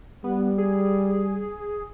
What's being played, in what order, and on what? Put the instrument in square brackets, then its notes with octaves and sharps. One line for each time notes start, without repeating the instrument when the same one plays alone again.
[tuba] G3 [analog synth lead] B3
[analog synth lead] G#4